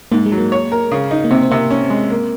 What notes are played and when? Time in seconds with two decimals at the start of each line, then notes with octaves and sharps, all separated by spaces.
0.12 G#2 A#3
0.26 G#3
0.32 F#3
0.38 A#3
0.52 C#5
0.72 A#4
0.92 C#3
1.11 D#4
1.25 A#3
1.30 C3 C4
1.42 C4
1.51 C3 A#3
1.71 C#4
1.90 G#3
2.10 A#3